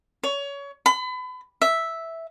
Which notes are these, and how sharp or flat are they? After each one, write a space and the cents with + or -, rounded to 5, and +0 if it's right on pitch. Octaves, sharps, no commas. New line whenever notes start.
C#5 +25
B5 +35
E5 -5